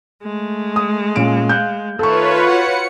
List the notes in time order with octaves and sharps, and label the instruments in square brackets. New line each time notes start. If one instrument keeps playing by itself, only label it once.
[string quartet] G#3 A3
[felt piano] D#6
A#2 C#4 D7
F5 F#6 G6
[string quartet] D#3 A3 [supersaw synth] F4 B4 C#5 [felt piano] A4 C#6
[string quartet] F#4 F#5 [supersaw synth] C#7